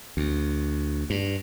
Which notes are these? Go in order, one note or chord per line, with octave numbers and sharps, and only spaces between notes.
D2
G2